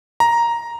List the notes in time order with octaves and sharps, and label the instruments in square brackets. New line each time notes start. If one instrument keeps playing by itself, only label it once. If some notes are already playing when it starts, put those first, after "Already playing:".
[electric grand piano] A#5